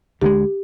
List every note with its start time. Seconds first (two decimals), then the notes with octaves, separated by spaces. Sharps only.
0.22 D2 D3 F3 G#3 G4